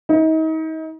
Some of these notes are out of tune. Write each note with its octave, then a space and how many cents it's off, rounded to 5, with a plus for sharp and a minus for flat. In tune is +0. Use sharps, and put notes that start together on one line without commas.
D#4 +35